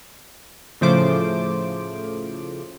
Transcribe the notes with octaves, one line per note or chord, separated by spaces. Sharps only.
A2 C#3 F3 A3 C5 D6